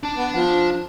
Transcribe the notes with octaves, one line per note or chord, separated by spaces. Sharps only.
D4 A5
B3
F3